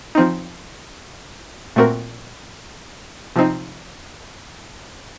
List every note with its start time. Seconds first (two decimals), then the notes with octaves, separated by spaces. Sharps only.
0.15 F3 C4 D#4
1.76 A#2 A3 C4 F#4 A#4
3.36 C3 F3 C4 D#4